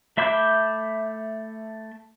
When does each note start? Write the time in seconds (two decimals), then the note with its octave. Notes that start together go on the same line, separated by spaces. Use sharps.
0.17 A3 E5 B5 D6 G6